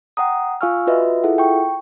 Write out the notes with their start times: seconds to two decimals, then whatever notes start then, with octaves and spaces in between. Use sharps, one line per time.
0.17 F#5 G5 A#5 D#6
0.61 F4 F5 G#5 C#6 E6 F6
0.87 F4 F#4 B4 D#5 E5
1.23 E4 F4 G#4 A4 E5 F#5
1.38 G5 C#6